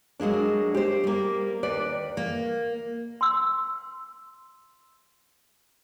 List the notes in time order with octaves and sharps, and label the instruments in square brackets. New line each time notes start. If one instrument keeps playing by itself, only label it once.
[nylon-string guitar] F#3 G#3 A#3 D4
G4 C5
G3 A#3
D#2 B4 D5
[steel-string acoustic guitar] A#3
[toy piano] C6 E6